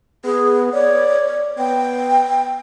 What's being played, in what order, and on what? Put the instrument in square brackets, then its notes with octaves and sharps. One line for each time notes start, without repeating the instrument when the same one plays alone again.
[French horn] B3 [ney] G#4
[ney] C#5 [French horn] D5
[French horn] B3 [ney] G5